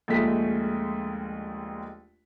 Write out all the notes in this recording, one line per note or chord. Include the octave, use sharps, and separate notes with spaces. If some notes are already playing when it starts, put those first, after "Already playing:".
A#1 D#2 G#3 A3 B6